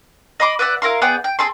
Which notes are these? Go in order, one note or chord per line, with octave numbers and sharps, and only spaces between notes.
D#5 B5 C6 D6
B4 D5 E5 F#5
E4 A#4 F5 C6
B3 G#4 D5 G5
G5
C4 G#4 A4 C6